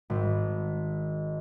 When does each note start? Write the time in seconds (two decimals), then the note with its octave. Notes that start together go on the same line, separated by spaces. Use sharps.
0.10 G#1